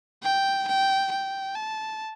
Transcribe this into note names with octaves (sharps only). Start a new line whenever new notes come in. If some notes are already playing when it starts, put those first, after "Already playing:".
G5
G5
G5
A5